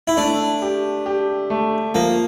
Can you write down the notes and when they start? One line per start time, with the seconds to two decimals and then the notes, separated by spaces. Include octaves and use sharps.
0.08 E4
0.17 A3 D4
0.62 G4
1.06 G4
1.50 A3
1.95 F3 A#3